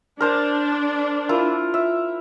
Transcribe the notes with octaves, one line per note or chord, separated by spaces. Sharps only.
D4 A#4 C5 A5
E4 F4 A#4
E5